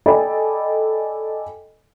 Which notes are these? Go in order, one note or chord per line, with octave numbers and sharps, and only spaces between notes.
A4 D5 D#5 G5 G#5 B5